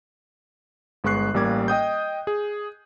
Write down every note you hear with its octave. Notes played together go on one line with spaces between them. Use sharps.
G1 G#3 B3 C#6 F#6 C7
A1 G3 A#3 D6 G#6
D#5 G5 D#6 G6
G#4